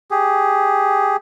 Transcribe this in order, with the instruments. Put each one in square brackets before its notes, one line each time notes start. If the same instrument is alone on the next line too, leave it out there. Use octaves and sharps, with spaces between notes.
[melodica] G4 G#4